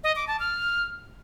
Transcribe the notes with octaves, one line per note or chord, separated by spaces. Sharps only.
D#5
D6
A5
F6